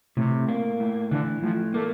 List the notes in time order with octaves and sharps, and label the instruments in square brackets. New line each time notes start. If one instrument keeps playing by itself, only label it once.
[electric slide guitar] A2 [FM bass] C3
[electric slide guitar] A#3
A2
[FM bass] D3 [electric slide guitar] E3
[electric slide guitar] A2 [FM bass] F3
[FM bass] A3 [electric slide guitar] A#3